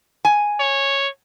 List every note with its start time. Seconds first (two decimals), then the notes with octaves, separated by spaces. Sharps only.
0.25 G#5
0.60 C#5